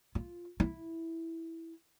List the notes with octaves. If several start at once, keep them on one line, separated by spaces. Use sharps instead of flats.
F4
E4